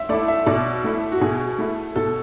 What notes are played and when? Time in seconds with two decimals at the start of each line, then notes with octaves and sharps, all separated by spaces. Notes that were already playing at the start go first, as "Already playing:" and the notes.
Already playing: E5
0.09 A3 D5
0.12 E4
0.28 E5
0.46 B2 D5
0.84 A3 E4
1.12 F#4
1.21 B2 G#4
1.58 A3 E4
1.96 B2 A4